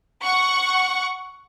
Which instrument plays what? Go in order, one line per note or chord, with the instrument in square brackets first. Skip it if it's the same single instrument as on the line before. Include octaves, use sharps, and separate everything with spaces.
[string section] F#5 C#6